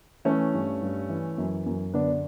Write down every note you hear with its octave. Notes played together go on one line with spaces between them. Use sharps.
E3 A3 C#4
G2
G2
E3
F#2
F#2
D3 B3 D4